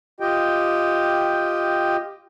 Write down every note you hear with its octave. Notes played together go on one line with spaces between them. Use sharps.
F4 G4 D#5 G5